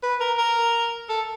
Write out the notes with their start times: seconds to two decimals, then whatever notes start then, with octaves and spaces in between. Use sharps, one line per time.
0.03 B4
0.20 A#4
0.38 A#4
1.09 A4